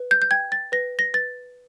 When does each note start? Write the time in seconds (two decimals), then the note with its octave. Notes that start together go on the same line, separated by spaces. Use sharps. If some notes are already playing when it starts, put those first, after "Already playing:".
Already playing: B4
0.11 G6
0.22 G6
0.31 G5 G#6
0.52 A6
0.72 B4 A#6
0.99 A#6
1.14 B4 A6